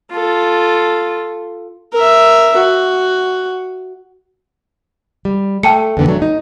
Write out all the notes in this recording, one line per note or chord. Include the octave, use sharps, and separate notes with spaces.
F4 A4
A#4 E5
F#4
G3
A3 G5 A5 C#7
E2 D3 B3
F#3 A3 D4
D#4